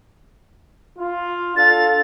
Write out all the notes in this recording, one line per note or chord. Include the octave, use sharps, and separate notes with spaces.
F4
D4 A4 F5 A6